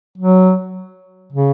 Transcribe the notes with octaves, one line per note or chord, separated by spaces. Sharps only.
F#3
C#3